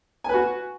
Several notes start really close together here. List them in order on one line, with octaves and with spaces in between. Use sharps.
G#5 B4 F#4